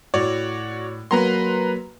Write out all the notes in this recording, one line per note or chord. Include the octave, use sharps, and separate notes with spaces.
A2 F#4 C#5 D5
F#3 A#3 B4 A#5 C6